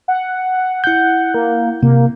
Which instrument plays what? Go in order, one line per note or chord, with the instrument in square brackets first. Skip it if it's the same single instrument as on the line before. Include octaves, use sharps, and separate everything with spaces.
[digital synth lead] F#5
F#5
[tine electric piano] E4 G6 [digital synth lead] F#5
[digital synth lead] A#3
[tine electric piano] C3 [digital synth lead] A#3